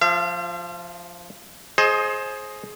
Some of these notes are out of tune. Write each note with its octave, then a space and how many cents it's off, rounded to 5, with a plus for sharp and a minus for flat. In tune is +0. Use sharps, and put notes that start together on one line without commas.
F3 +0 F5 -45
G#4 +25 C5 +20 D#5 +0